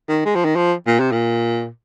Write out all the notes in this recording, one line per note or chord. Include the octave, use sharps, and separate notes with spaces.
D#3
G#3
F3
D#3
F3
A#2
C3
A#2